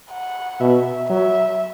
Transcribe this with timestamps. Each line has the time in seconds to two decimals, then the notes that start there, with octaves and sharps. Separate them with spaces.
0.11 F#5
0.60 B2 E5
1.09 F#3 E5